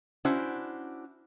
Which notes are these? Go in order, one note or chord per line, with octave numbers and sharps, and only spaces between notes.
C#4 D4 E4 F#4 C5